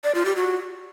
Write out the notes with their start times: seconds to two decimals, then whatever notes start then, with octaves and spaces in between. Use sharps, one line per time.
0.04 D5
0.15 F4
0.25 G4
0.36 F#4